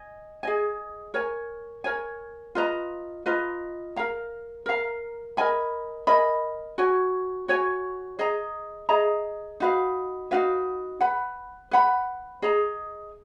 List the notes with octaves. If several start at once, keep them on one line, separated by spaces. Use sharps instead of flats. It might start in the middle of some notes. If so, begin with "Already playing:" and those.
Already playing: D#5 G#5
G#4 D#5 G#5
A#4 C#5 G#5
A#4 C#5 G#5
F4 B4 D#5 A#5
F4 B4 D#5 A#5
A#4 F5 A#5
A#4 F5 A#5
A#4 D#5 G#5 B5
A#4 D#5 G#5 B5
F#4 C#5 G#5
F#4 C#5 G#5
G#4 D#5 A#5
G#4 D#5 A#5
D#4 F#4 B4 F5
D#4 F#4 B4 F5
B4 F#5 B5
B4 F#5 B5
G#4 D#5 A#5